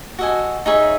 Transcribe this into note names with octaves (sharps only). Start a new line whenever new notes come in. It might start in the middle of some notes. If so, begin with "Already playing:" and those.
F#4 A4 D#5 G#5
D#4 G#4 C#5 E5